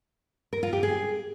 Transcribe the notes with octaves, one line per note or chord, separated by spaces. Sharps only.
A#4
F4
G4
G#4